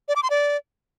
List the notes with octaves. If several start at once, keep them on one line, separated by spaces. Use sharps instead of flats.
D5
D6
C6
D5